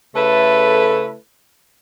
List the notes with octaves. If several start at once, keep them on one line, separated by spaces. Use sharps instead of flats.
C#3 A3 E4 A4 B4